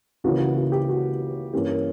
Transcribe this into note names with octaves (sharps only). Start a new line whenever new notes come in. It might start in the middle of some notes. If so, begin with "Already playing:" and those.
C#2 C#3 E3 A#3 F#4
F#4
F#4
G4
F#4
G2 E3 A#3 C#4 G4
A#4